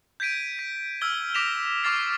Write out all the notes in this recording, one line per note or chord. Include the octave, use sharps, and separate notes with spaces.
G6 G#6 B6 D7 D#7
B6
E6 F6 G#6 G7
D6 A#6 B6 D7 E7 F7
C#6 D6 F6 A6 C7